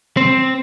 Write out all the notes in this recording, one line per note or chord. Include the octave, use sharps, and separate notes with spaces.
C4